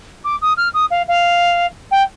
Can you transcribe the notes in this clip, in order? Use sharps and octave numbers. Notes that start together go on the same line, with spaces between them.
D6
D#6
F6
D#6
F5
F5
G5